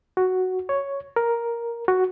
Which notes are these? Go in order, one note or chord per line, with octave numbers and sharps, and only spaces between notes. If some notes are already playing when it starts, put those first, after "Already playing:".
F#4
C#5
A#4
F#4